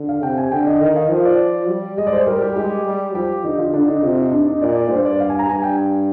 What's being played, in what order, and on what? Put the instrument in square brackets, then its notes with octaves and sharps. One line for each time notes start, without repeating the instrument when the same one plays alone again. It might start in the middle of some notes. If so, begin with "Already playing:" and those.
Already playing: [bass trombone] D3
[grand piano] F5
[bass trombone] C3 [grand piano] G5
[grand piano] G#5
[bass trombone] D3 [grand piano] G5
[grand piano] D#5
[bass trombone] D#3 [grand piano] D#5
[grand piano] F5
[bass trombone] F3 [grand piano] A#4
[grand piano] D5
[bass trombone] G3
[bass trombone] G#3 [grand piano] D#5
[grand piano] D5
C5
[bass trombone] G3 [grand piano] A#4
[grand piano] G4
[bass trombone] G#3 [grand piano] G4
[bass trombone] G3
[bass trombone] F3 [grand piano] G4
[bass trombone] D3 [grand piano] D#4
[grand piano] F4
[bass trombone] D3 [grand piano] D4
[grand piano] D#4
[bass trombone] C3 [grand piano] F4
[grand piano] D#4
D4
D#4
[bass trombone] A#2 [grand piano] D5
[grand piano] D5
[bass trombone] G2 [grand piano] C5
[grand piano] D5
F5
G#5
A#5
[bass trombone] G2 [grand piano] G#5
[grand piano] G5